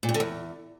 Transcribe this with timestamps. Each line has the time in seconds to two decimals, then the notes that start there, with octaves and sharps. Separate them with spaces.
0.03 A#2
0.09 G2
0.14 D3
0.20 E2